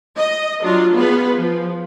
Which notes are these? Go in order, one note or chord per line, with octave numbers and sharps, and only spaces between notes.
D#5
F#3 D4 F4
B3 F4 G#4 B4
F3